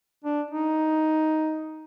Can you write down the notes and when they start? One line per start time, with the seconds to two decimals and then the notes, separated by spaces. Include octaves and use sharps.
0.24 D4
0.51 D#4